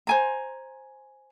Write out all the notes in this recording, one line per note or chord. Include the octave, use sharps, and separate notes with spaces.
C5 G#5 A#5